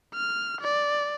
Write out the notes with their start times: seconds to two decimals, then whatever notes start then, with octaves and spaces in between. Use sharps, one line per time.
0.15 F6
0.61 D5